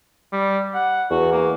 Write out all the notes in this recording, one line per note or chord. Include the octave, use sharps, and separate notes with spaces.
G3
F#5
E2 F#4
A#3